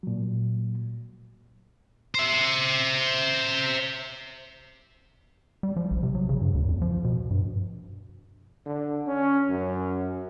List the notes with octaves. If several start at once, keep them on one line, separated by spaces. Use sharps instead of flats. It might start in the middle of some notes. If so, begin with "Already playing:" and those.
A#2 F#3
C5 E5
G3
F3
A#1
C3
F#3
C#3
G2
D2
F2
F3
B2
G2
D3
C#4
F#2